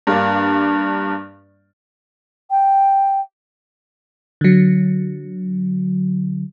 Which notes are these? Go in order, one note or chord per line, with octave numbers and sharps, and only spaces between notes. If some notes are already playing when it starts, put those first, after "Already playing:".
G2 A#3 D4
G5
D3 F#3